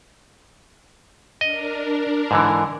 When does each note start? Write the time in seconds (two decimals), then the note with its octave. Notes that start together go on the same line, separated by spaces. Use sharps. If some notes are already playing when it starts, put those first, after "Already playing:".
1.41 D4 A#4 D#5
2.31 G#2 D3 E3